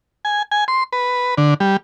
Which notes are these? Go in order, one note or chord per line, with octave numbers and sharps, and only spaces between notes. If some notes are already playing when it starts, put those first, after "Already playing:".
G#5
G#5
C6
B4
D3
G3